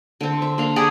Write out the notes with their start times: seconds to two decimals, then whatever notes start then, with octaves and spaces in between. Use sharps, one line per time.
0.21 D3 C4
0.42 E5
0.58 A#3 D4 F5
0.76 G4 G#4 D5 F#5